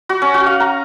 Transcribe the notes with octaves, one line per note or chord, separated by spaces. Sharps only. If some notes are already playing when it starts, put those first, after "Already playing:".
F#4
C#4
F#4
F5
A#5